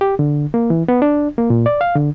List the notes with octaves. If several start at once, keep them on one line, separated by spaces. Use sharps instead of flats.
G4
D3
A#3
E3
B3
D4
A#3
A#2
D5
F5
D3